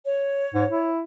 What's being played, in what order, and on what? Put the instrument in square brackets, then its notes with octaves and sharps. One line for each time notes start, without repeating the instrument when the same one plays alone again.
[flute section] C#5
[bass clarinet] G#2
E4